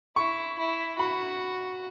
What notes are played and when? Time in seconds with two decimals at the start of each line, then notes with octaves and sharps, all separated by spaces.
0.16 E4 C#6
0.59 E4
0.98 F#4 B5